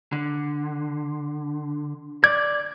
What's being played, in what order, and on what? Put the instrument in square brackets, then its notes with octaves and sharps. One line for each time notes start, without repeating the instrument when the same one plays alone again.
[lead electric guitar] D3
[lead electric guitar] D5 [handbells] G#6